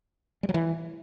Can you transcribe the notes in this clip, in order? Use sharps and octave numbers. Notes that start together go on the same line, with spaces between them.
G3
F#3
E3